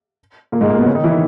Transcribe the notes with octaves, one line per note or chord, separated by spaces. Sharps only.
A#2 A#3
G#2 G#3
A#2 A#3
B2 B3
C#3 C#4
D#3 D#4
E3 E4
D#3 D#4